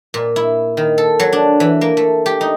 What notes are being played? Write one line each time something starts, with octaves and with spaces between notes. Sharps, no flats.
A#2
E4
D#3
A4
F#3
D4
E3
A#3
A3
G4
D#4